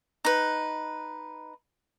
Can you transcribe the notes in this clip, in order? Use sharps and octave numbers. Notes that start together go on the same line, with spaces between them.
D#4 B4